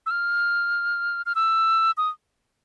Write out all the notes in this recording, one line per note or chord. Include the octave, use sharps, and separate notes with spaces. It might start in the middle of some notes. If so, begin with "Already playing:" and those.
E6
F6
F6
E6
D#6